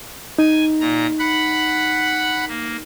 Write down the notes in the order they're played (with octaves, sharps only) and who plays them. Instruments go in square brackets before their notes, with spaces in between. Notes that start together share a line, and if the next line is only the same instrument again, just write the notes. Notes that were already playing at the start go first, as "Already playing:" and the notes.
[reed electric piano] D#4 [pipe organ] G#5
[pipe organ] A#2 A#5
F#5 B5
A#3